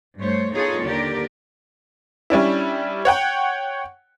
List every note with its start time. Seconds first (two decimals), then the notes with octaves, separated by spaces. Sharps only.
0.19 G2 A3 C5 C#5
0.54 B3 D#4 F4 G#4 A4 C#5
0.84 D#2 D3 G4 A#4 D5
2.30 G3 C#4 D4 E4
3.05 C#5 F#5 G5